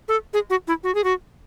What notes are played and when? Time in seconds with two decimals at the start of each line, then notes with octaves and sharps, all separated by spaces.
0.08 A4
0.33 G#4
0.50 F#4
0.68 E4
0.84 F#4
0.95 G#4
1.04 F#4